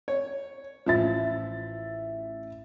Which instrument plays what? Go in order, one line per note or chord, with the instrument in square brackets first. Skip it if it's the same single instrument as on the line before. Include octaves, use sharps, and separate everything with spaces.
[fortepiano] C#5
[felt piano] A1 E5 A6 [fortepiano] F3